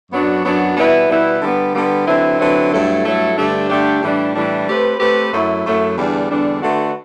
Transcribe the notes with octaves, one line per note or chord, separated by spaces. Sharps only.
F#2 F#3 B3 D4 F#4
F#2 F#3 B3 D4 F#4
B2 G3 B3 E4 B4
B2 G3 B3 E4 B4
D3 G3 B3
D3 G3 B3
D3 F#3 C4 E4 B4
D3 F#3 C4 E4 B4
G2 F#3 A3 E4 A4
G2 F#3 A3 E4 A4
G2 D3 A3 D4 G4
G2 D3 A3 D4 G4
A2 E3 G3 D4
A2 E3 G3 D4
A3 C4 G4 B4
A3 C4 G4 B4
F#2 F#3 A3 E4
F#2 F#3 A3 E4
E2 D3 G3 D4
E2 D3 G3 D4
D3 A3 D4 F#4 B4